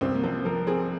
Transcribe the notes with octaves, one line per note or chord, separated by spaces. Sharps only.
C2 C4
A#3
F3 C4
F3 A#4
C4 G#4